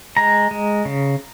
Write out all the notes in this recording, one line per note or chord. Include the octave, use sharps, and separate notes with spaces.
G#3 A#5
G#3
C#3